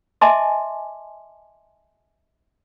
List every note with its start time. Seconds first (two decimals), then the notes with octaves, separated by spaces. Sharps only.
0.21 D#5 E5 G#5 A5 C6 D6